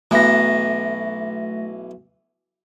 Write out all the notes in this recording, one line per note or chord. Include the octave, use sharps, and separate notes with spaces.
B1 E3 A3 A#6